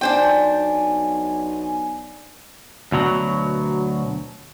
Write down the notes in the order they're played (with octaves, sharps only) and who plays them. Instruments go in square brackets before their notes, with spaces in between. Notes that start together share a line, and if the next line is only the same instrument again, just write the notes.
[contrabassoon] B1 [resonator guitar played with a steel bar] D4 C5 G5 [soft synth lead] G#5
[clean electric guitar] D2 B2 F#3